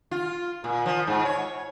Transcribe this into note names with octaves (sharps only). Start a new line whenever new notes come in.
F4
A#2
F3
G#2
C#5